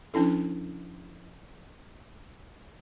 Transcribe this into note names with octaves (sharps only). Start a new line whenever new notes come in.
F3 C#4 D4 E4 A4